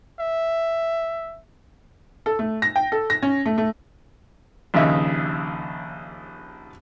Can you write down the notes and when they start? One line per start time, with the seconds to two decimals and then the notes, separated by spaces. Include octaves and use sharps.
0.20 E5
2.26 A4
2.39 A3
2.62 A#6
2.76 G5
2.92 A4
3.10 A#6
3.22 C#4
3.46 A3
3.58 A3
4.74 A#1 D#2 C#3 D#4 E5